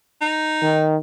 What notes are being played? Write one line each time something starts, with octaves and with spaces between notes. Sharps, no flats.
D#4
D#3